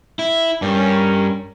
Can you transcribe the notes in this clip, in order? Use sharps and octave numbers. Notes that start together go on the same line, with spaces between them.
E4
G2 C#4 A#4